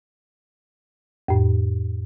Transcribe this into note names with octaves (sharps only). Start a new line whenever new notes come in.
F2 A2